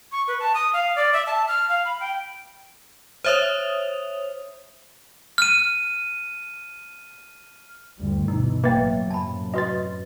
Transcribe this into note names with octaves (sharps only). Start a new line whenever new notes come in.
C#6
B4
A5
D#6
F5
D5
E5
A5
F6
F5
B5
G5
C5 C#5 E5 D#6 F7
F6 D#7
G1 D2 G3
B2 E3 D#4
A1 F#3 A#3 B4 E5 G5 A6
F#2 A2 C3 A5 B5
F#4 B4 D#5 C6 A6